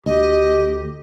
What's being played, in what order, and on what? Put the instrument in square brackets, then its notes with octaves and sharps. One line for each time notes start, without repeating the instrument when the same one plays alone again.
[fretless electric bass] D2 [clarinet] G4 [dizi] D#5